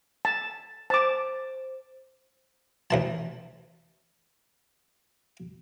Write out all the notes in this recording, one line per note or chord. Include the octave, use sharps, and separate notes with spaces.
A5
C5 A5 D6
D2 E3 A5